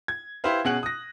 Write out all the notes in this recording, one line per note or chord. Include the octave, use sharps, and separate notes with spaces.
G#6
E4 G4 B4 C5 F5
B2 C#4 G#4 F#5 F#6 F#7
D#6 A#6